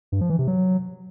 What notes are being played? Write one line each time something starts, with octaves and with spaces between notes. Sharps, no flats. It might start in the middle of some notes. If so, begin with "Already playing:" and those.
G2
F3
E3
C3
F#3